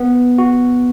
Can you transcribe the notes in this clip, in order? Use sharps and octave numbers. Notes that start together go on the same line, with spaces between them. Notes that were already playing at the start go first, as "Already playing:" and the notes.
Already playing: B3
F#4